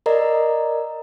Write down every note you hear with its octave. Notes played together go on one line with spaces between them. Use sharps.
A#4 D5 D#5 A#5